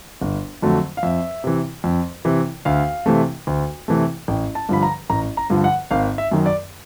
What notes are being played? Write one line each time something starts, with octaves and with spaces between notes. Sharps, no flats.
G1
F2 D3 F#3 A3
F5
F2 E5
C3 E3
F2
C3 E3
D2 F5
C3 E3 A3
D2
C3 E3 A3
A1 G5
A5
G2 D3 F3 B5
A#5
A1 A#5
A#5
G2 D3 F3
F#5
G#1 F5
E5
F#2 D#3 F#3
D5